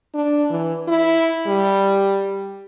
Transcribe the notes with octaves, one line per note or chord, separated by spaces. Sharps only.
D4
E3
E4
G3